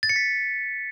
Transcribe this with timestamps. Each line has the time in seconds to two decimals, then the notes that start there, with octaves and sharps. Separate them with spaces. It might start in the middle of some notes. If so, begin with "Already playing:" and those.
0.03 A6
0.09 C#7
0.16 B6